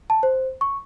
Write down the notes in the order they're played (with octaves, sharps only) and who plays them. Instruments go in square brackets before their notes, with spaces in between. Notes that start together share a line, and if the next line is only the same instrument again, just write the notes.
[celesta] A5
C5
C#6